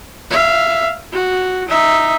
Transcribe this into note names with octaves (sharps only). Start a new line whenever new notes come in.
E5 F5
F#4
D#4 E5